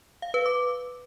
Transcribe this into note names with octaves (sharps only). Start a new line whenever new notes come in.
F5
B4
D6